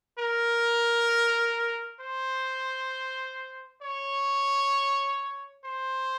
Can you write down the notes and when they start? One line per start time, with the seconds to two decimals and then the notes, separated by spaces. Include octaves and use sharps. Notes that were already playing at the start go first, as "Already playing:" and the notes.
0.19 A#4
2.00 C5
3.82 C#5
5.65 C5